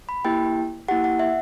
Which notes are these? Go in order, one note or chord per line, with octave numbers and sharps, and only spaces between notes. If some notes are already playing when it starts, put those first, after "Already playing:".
B5
A#3 E4 G4 G5
A#3 E4 G4 F#5
F#5
E5